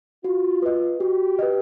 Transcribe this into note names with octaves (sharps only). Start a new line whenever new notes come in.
F4 F#4
B4 D#5
F#4 G4
B4 D#5